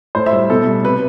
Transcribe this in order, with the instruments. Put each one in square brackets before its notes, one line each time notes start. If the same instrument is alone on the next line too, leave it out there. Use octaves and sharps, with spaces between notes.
[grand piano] A2 C5
E5
G3
B2 A4
G3
C3 B4